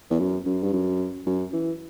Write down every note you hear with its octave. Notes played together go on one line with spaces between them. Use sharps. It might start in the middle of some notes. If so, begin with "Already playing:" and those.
E2
F#2
F#2
G2
F#2
F#2
E3